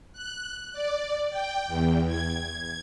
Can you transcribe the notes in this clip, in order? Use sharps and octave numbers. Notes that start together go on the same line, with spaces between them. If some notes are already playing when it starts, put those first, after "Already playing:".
F#6
D5
G5
E2
G#6